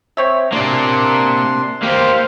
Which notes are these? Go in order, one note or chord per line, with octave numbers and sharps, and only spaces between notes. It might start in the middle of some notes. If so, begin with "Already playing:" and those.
C4 C#5 E5
C3 F#3 A#3 D4 D5 C6
A#3 G4 C5 F5